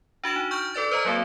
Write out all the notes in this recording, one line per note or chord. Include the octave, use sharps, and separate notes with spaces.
D4 F#4 D7 E7
D#4
C#6 F6 G6 D7
A4 B4 D5 A6
B4 C5 D#5 A#5
F#3 A#3 C4 F#4